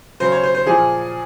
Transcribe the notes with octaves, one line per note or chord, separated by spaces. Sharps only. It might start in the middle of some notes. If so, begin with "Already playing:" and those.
C#3 F#3 C5
C#5
C5
C5
A#2 F3 G#4